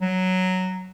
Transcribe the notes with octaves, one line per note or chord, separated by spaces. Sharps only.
F#3